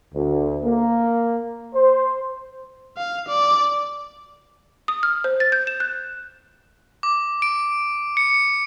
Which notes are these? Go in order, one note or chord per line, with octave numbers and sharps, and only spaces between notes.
D2
A#3
C5
F5
D5
D#6
F6
C5
A6
G6
E7
F#6
D6
D7
C#7